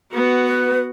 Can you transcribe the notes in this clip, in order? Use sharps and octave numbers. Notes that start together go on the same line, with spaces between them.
B3 F#4
B4